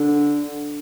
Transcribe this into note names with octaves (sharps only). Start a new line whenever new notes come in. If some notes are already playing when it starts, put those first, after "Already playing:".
Already playing: D3